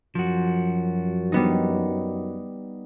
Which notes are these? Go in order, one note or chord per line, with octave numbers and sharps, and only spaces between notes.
F#2 F3 F#4
G3 B3 D#4